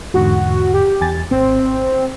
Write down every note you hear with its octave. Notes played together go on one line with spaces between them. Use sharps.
E2 G#2 D3 F#4
G4
E2 G#5 A6
G#1 C4